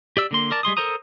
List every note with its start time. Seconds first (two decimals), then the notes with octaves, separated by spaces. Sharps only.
0.17 G4 D5 E6
0.31 D3 A#3 C6
0.51 A#4 D5 A5
0.63 G3 G#3 C6 D#6
0.77 A4 A#4 C5 A#5 D#6